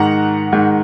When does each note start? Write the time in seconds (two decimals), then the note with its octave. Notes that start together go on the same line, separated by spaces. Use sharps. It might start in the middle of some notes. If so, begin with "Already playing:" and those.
Already playing: G#2 D#3 F#5 A#5
0.52 G#2 D#3